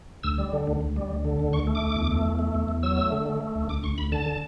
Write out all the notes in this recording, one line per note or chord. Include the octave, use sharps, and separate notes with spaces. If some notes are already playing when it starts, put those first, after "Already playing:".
D2 E6
G3
D3
D2
D2
G3
D2
D3
D2
D2 C#6
A3
D6
D2
E2
A3
E2
A3
E2
E2
F#3 E6
A3
D3
A3
A3
D2
D2 D6
D2 C#6
D2 B5
D3 A5
D3